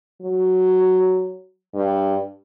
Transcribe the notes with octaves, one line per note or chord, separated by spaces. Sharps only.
F#3
G2